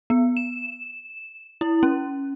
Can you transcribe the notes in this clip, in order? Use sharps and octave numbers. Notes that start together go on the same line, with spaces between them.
B3
E7
E4
C#4